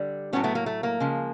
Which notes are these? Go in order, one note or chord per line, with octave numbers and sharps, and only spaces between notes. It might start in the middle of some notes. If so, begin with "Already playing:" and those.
Already playing: D3 G3
A2 F#3 A3 B3 C#4
A3 B3
A#3
A3
A#3
C#3 F3 G#3